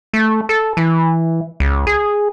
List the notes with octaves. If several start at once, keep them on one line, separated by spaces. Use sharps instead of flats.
A3
A4
E3
C#2
G#4